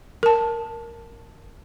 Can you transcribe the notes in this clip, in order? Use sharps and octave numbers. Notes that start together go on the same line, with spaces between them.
A#4 A5